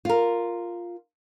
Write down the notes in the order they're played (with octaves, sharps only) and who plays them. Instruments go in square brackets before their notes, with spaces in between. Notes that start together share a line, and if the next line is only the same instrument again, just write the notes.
[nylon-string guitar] F4 A#4